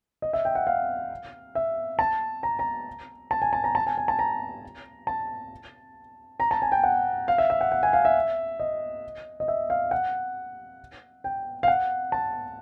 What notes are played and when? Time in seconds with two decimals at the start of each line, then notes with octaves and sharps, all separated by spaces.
0.22 D#5
0.33 E5
0.45 G5
0.55 F#5
0.67 F5
1.55 E5
1.99 A5
2.43 A#5
2.59 A#5
3.31 A5
3.42 G#5
3.53 A5
3.64 A#5
3.75 A5
3.87 G#5
3.98 G#5
4.08 A5
4.19 A#5
5.07 A5
6.40 A#5
6.51 A5
6.62 G#5
6.72 G5
6.83 F#5
7.28 F5
7.38 E5
7.50 E5
7.61 F#5
7.72 F#5
7.83 G#5
7.93 F5
8.05 E5
8.60 D#5
9.40 D#5
9.48 E5
9.70 F5
9.91 F#5
11.24 G5
11.63 F5
11.68 F#5
12.12 A5